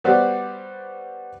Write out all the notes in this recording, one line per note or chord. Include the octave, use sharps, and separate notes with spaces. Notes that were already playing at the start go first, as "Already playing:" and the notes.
G3 B3 F#4 G4 C5 D5